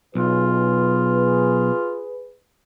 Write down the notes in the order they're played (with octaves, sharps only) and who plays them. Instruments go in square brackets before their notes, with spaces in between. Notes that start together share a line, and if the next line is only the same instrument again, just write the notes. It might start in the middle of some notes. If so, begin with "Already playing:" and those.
[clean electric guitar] B1 [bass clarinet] F4 [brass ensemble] G#4 B4